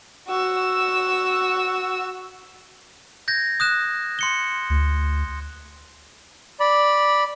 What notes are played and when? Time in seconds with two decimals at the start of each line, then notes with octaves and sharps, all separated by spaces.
0.28 F#4 E6
3.28 G6 G#6 A#6
3.60 D#6 F#6 E7
4.19 C6 C#7 G7
4.70 D2
6.60 D5 B5